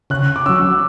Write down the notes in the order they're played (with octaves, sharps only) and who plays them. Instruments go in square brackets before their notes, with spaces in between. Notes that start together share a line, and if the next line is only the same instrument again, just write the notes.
[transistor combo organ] C#3 [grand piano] F#6
[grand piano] D6
[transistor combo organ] F#3 C#4 [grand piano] E6